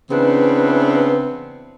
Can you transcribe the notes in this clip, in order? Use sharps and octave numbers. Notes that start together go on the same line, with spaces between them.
C#3 E3 B3 C4 D4 B4